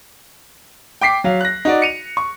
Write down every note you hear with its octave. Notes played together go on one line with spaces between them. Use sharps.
G5 D6 B6 C7
F#3 F5
F#6 A#6
D#4 F#4 D5
C#7 D#7 F7
C#6